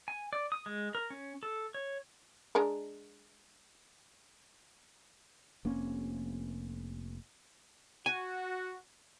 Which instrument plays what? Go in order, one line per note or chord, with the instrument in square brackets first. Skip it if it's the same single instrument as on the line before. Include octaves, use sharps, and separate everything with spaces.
[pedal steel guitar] G#5
D5
D#6
G#3
A#4
C#4
A4
C#5
[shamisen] G#3 D4 A#4
[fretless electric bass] F1 A#3 C4 C#4
[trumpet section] F#4 [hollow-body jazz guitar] G#5